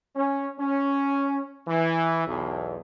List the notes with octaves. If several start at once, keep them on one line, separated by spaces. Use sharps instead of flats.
C#4
C#4
E3
B1 E2